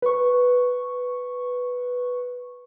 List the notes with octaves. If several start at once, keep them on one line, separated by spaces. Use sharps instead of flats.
B4 C#6